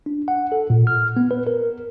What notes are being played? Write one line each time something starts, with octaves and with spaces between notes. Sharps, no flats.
D4
F#5
A4
A#2
F6
B3
B4
A#4